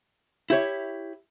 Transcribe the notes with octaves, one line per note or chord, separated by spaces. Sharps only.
E4 G4 C#5